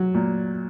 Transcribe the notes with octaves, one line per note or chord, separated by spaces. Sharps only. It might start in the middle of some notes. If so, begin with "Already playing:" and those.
Already playing: F#3
A#2